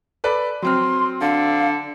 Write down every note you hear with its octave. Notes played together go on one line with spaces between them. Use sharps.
A4 B4 D5
F#3 C4 C6 F6
D3 F5